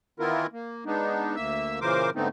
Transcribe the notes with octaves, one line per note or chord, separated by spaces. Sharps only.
D#3 E3 B3 E4 F4 A#4
A#3
G#3 B3 D4 D#4
D2 A#3 E5 E6
A#2 C#3 E3 A#4 C5 D6
G#2 D3 A3 B3 C4 D#4